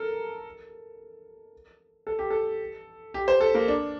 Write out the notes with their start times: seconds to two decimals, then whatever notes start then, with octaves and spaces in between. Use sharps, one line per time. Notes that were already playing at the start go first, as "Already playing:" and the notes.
Already playing: A4 A#4
2.07 A4
2.19 G4
2.30 A4
3.14 G4
3.28 C5
3.41 A4
3.55 A#3
3.68 D4